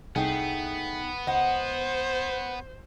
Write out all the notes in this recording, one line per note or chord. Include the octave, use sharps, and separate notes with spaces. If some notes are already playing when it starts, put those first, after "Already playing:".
C2 A3 B3 D#4 G#4 G5
C#2 C5 D#5 F#5